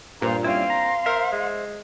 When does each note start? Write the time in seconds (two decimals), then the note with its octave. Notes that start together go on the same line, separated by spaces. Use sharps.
0.21 G2 A#2 C5 A#5
0.44 G3 C4 C#4 E4 F5 C6
0.70 A#5
1.06 A#4 C5 E5
1.32 G#3